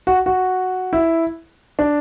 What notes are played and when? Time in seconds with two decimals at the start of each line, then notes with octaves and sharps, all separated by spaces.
0.07 F#4
0.26 F#4
0.93 E4
1.79 D4